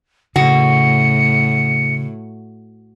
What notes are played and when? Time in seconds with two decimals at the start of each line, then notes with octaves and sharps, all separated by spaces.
0.36 A2 C#3 F#4 C#7